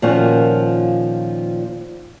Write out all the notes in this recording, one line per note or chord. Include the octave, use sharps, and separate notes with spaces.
A#2 D#3 F3 A#3 C#4 F#4